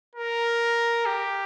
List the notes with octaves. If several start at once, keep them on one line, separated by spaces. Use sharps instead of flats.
A#4
G4